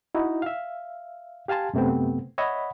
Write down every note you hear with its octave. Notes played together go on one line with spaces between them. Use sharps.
D#4 E4 F#4
E5 F5
G4 F5 G#5 A5 C6
F#2 C3 A3 B3 C4
C#5 D#5 E5 F#5 B5